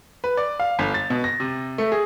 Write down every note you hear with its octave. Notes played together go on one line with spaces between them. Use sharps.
B4
D5
F5
G1
A6
B2
A#6
C3
A3
G#4